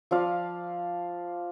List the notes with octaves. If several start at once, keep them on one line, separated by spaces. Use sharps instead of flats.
F3 D5 F5